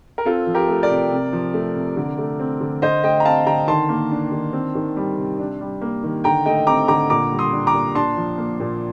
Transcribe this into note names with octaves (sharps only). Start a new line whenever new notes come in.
A#4
C4 F4 A4
F3
G4 A#4
A3
A#4 D5
C3
C3
F3
A3
C3
D3
A3
C4
D3
D3 C5 D#5
A3 D#5 G5
A#5
C4 F5 A5
D3 G5 A#5
D#3 A5 C6
A#3
D4
D#3
C4
D#3
G3
C3
D4
G3
A#3
D#3
D3 G5 A#5
A3 D#5 G5
C4 A#5 D6
D3 A#5 D6
A#2 A#5 D6
G3
C6 D#6
D4
A#5 D6
A#2
D4 A5 C6
F3
A#3
A#2